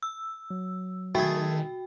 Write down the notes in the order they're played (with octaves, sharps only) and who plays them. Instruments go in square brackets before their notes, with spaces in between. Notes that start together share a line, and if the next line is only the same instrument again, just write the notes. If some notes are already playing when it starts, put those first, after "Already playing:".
[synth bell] E6
[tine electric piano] F#3
[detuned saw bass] D#3 [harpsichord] A3 G#4 [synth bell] F#4 G5